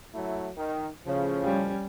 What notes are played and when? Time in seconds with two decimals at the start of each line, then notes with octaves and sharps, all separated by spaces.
0.15 F#3 A3 E4
0.57 D#3
1.07 A2 C#3 F3
1.43 G3 C#4